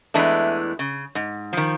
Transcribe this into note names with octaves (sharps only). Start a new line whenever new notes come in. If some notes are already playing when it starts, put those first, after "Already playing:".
E2 E3 G#3 A3 D4
C#3
G#2
D#3 F3